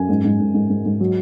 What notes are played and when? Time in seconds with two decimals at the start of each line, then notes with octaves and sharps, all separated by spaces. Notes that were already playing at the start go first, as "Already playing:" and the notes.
Already playing: F#2 G#5
0.09 G#2
0.24 G#2
0.39 G#2
0.54 G#2
0.70 G#2
0.85 G#2
1.00 F#3